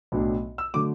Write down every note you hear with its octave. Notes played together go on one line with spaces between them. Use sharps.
B1 A2 F#3 D4
E6
D3 F#3 A3 D6